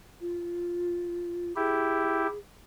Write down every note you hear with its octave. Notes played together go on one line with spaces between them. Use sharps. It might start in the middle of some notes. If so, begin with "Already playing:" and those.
F4
E4 G4 G#4